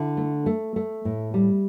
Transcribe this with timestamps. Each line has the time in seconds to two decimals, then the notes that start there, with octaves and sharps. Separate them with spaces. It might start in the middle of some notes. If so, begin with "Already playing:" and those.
Already playing: D3 E4
0.17 A3
0.46 A3
0.76 A3
1.05 A2
1.34 G3